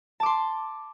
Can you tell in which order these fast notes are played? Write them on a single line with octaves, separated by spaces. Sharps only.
A5 D6 C6